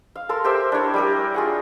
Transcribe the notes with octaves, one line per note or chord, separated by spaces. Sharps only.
F5
A4 A#4 C6
G4 A#4 C5 E5
D4 E4 C#5 B5
G3 G4 A#4
F4 G#4 F#5